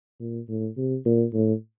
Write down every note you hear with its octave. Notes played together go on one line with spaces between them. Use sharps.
A#2
A2
C3
A#2
A2